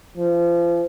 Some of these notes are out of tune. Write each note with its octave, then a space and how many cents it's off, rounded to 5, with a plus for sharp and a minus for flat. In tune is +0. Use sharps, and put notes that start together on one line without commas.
F3 -30